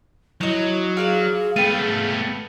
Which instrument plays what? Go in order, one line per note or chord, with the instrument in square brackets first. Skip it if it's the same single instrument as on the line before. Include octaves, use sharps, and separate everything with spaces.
[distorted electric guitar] F#3 [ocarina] E4 [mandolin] D#5 G6
[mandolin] F4 D5 F5 [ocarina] G#4
[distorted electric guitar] A3 B3 [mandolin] F5 G5 [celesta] D#7